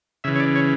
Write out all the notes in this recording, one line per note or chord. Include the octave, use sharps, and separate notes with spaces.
C#3 E3 E5
C#5
D5
C#5